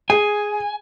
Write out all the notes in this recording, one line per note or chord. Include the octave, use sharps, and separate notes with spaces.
G#4 G#5